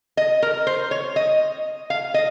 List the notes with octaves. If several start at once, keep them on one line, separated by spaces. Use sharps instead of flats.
D#5
A#4
C5
C#5
D#5
F5
D#5